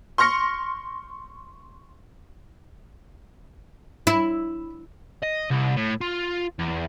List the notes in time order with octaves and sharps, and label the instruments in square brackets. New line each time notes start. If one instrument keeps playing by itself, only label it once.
[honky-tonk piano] C6 C#6 F6 A#6 C#7
[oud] E4
[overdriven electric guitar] D#5
C2
A2
F4
E2